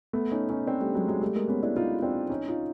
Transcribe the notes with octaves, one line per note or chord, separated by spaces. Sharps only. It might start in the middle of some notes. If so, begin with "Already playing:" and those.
A3 B3
C#4 D#4
C#4 D#4
C4 D4
G3 A3
F#3 G#3
F#3 G#3
G3 A3
G#3 A#3
B3 C#4
D4 E4
D#4 F4
C4 D4
C#4 D#4
D#4 F4